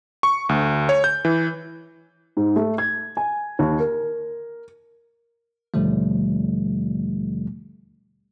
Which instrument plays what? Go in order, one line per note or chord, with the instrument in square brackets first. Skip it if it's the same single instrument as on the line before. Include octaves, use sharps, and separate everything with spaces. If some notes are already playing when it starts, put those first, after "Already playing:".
[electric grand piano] C#6
D2
C#5
G6
E3
[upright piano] G#2
A3
G#6
G#5
D#2
A#4
[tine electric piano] D#2 B2 D3 F3 G3 A3